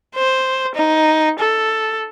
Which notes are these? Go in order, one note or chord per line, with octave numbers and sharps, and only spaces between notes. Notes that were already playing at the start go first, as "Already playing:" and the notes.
C5
D#4
A4